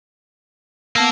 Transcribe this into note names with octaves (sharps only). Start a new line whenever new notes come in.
A#3 B3 A5 E6